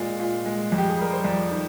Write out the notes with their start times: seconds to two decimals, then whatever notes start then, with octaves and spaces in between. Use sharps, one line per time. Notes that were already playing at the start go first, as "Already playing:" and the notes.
Already playing: A#2 G#3
0.20 A#2
0.46 G#3
0.72 F2
0.78 G4
0.90 G#4
0.98 G3 A#4
1.13 C5
1.25 F2 D5
1.51 D#3